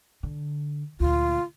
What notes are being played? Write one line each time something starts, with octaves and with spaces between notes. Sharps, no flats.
D3
D2 A#2 F4